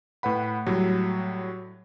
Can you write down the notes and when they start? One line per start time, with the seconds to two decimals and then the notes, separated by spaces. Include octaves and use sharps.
0.23 A2 B4 F#5 B5
0.66 A2 F#3 G3